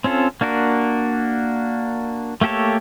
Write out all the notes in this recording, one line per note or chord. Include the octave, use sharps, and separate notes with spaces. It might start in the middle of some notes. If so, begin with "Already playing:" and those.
C4 C#4 F4 A4
A#3 D4 F#4 A#4
A3 A#3 G4 A4 C#5